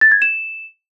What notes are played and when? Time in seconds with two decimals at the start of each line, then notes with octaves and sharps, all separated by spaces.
0.01 A6
0.12 G#6
0.22 E7